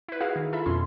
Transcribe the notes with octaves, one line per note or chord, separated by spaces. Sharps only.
E4 B4
E4 F#4 G#4 F5 F#5
D#3
F4 A4 E5 B5
F2 B2 C#4 C6